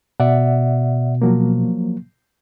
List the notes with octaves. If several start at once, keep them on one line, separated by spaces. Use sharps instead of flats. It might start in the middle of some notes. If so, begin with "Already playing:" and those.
B2 D5 E5 F#5
F3 F#3 A#3